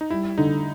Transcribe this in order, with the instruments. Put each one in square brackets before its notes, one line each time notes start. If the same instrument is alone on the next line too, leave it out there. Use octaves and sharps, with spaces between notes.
[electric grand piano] D#4
[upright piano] G3 [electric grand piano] E4
[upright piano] D3 [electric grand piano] D#4